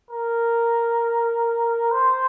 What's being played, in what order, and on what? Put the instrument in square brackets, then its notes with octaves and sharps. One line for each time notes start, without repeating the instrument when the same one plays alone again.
[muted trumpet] A#4
C5